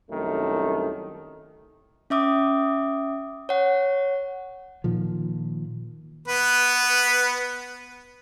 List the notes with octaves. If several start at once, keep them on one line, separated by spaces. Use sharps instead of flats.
C2 F#2 D#3 A3
C#4 E5 D6 D#6
C#5 F#5
A#2 D#3 F3
B3 B4